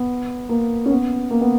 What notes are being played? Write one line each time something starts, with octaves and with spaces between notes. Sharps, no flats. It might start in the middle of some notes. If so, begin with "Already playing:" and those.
Already playing: B3
A#3
C#4
B3
A#3
B3